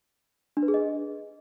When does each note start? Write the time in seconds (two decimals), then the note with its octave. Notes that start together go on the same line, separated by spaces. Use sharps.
0.57 D4
0.63 B4
0.68 G#4
0.74 D#5